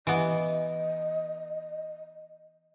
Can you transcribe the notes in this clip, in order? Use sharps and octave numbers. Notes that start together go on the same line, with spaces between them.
E3 B3 D#5